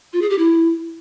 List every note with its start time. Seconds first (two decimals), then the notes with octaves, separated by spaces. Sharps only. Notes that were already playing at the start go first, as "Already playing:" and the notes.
0.13 F4
0.22 G#4
0.30 G4
0.38 E4